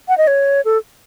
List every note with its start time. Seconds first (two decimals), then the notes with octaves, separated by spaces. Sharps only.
0.08 F#5
0.18 D#5
0.27 C#5
0.65 A4